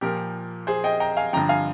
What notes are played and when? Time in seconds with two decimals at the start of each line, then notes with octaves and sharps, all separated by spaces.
0.01 A#2 F3 G4 A#4
0.67 G#4 C5
0.84 D#5 G5
1.00 G5 A#5
1.17 F5 G#5
1.33 G2 D3 F3 G5 A#5
1.49 F5 G#5